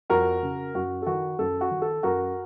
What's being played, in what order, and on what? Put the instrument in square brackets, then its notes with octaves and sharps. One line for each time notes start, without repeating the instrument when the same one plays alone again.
[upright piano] F2 F#4 A#4
C#3
F#2 F#4
A4
D#3 F#4
F#2 A4
F#4
D#3
A4
F#2 F#4 A#4